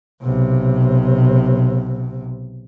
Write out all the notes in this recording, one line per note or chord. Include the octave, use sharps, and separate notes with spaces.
B1 C3